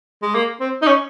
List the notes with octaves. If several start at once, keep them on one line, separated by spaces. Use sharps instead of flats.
G#3
A#3
C4
D#4
C#4